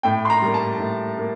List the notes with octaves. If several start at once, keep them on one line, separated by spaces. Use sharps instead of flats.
A2 G5
C6
A#5
G3 A#3
A5
A2
A#3